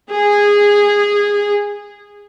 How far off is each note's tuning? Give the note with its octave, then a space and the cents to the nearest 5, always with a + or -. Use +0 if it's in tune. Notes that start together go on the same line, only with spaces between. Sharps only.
G#4 -15